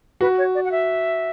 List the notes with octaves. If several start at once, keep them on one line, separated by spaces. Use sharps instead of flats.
F#4 B4
C#5
D5
F#5
E5